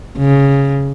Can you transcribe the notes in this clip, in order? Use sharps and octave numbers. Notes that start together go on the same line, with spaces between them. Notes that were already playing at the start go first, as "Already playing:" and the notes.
C#3